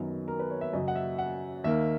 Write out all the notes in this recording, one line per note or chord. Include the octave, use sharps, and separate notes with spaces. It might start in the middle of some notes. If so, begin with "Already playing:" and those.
Already playing: F#2 D#3 F#3 B3
A#4
B4
C#5
E5
F#2 C#3 F#3 D#5
F#5
E5
F#5
D#2 D#3 A#3 E5